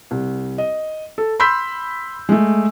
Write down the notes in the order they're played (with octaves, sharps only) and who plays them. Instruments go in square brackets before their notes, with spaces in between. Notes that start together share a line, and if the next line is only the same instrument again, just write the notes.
[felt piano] C2
D#5
A4
B5 C6 E6 G6 B6
G#3 A3